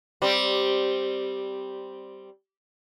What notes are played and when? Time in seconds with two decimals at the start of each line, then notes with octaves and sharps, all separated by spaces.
0.22 G3 C4